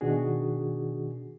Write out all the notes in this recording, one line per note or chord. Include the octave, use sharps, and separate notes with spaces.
B2 D#3 D4 F#4 G#4